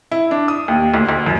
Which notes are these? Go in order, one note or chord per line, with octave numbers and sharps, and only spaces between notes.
E4
D4
D#6
D#2
D2
D2
F#2